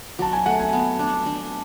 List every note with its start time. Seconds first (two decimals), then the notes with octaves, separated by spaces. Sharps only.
0.19 F#3 A5
0.33 G#5
0.46 A3 F#5
0.60 G#5
0.73 B3
0.99 D4
1.26 D4